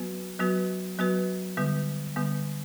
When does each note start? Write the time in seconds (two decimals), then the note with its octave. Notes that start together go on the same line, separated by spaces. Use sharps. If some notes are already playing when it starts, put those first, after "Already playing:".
Already playing: F#3 B3 F#4 B4
0.39 F#3 B3 F#4 B4
0.98 F#3 B3 F#4 B4
1.57 D3 G3 B3
2.16 D3 G3 B3